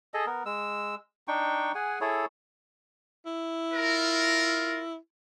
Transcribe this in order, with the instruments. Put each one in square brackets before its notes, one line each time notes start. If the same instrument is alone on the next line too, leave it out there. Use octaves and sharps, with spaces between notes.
[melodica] G#4 A4 D#5
B3 A#4
G#3 E6
D4 D#4 G5 C#6
G#4 F#5 G#5
E4 G#4 A4 C#5
[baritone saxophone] E4
[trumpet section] F4 A#4